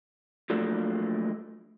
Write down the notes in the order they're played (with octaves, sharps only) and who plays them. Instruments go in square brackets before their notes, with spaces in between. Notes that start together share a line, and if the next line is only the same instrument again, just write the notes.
[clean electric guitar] F3 F#3 A3 A#3 D4